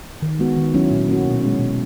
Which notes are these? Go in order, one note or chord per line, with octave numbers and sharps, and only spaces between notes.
D#3
G#3 B3 F#4
D#3
F#3 C#4 E4
A#2
A#3 C#4 F#4
B2
G#3 C#4
B2